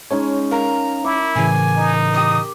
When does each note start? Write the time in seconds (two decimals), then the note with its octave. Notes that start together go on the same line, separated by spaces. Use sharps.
0.11 G#3 C#4 D#4 C#5
0.51 A#4 F5 A#5
1.04 E4 C#6 D6
1.36 A2 C#3 E3 G#5
1.77 D#4
2.14 G4 D6 D#6